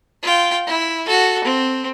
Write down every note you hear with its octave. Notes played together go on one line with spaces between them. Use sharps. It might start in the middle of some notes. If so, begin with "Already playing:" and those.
F4 G5
E4
F#4 A4
C4